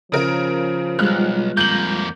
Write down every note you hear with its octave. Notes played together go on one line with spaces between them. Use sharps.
C#3 F3 A#4
B1 G2 G3 G#3 F4 F6 F#6
F2 A#3 G6 F#7